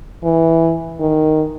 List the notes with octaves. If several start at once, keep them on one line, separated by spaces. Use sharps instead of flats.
E3
D#3